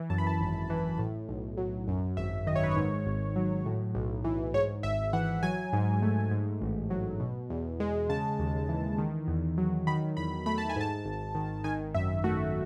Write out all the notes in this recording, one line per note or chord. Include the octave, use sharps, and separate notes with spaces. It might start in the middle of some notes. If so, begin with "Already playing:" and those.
Already playing: E3
F#2 A5
B5
A5
G#1
E3
A2
B1
F#3
F#2
G#1 E5
D#3 D#5
C#5
B4
C#5
G#2
G#1
F#3
A2
B1
E3
G#2 C#5
G#1 E5
E3 F#5
F#3 G#5
G#2
A3
G#2
A1
F#3
B2
E2
G#3
C#3 A5
D#2
E3
D#3
E2
F#3
D#3 B5
E2 B5
A3 B5
A5
G#5
G#2 A5
G#1
D#3
D#3 G#5
F#2 E5
A3 F#4